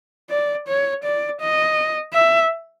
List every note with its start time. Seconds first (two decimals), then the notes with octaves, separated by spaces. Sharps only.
0.30 D5
0.68 C#5
1.04 D5
1.41 D#5
2.14 E5